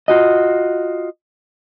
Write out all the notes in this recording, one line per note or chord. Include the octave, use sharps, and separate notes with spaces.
F4 F#4 D#5